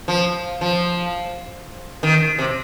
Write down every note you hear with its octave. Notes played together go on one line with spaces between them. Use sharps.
F3
F3
D#3
C3